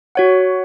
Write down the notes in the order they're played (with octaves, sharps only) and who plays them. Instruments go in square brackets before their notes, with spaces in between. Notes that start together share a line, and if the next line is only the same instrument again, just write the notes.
[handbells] F#4 C#5 F#5